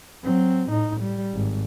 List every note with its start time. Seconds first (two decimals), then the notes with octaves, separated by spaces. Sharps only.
0.24 F#3 C4
0.70 A2 D#4
1.01 G3
1.34 G#1